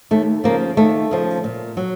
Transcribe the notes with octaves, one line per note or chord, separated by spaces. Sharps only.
D#2 A3
C#3 F3 A#3
D#2 A3
C#3 F3
A#2
F#3